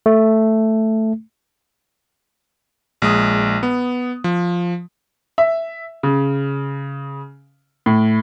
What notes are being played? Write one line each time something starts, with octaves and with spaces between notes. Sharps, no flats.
A3
A#1 G#3 D#6
B3
F3
E5
C#3
A2